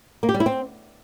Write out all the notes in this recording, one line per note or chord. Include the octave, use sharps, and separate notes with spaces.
A#3
G4
G3
E4
C4